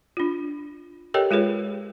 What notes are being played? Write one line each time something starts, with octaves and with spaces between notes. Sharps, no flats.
D4 F4
G4 A4 A#4 C#5 D#5 G5
G#3 F4 G#4 B4 C#5